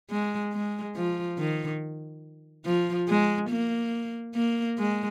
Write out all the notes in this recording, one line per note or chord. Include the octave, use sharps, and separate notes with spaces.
G#3
G#3
F3
D#3
F3
G#3
A#3
A#3
G#3